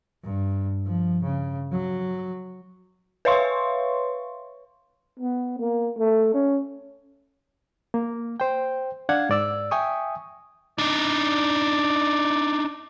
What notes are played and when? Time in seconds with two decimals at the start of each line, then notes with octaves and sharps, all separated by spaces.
0.24 G2
0.86 F3
1.23 C#3
1.71 F#3
3.25 B4 C#5 E5 F5 C6 C#6
5.20 B3
5.60 A#3
5.98 A3
6.34 C#4
7.94 A#3
8.40 C5 G5
9.09 D4 D5 F5 F#5 G#6
9.29 G#2 D5 E6
9.71 E5 G5 G#5 C#6 D#6
10.78 D4 D#4 D5